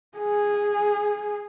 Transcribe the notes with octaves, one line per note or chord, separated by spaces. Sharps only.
G#4